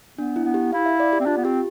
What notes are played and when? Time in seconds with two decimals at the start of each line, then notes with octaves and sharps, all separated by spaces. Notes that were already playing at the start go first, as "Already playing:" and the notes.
0.18 B3 D4
0.36 E4
0.45 B3
0.54 G4
0.73 E4 F5
0.86 E5
1.00 D5
1.13 G4
1.20 C4
1.26 D4 F4
1.37 B3
1.44 C4 G4